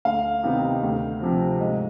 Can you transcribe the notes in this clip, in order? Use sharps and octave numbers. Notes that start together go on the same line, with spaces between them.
D2 F5
C3 D#3 B3 D#4
D2
C3 F3 C4
G#2 D#5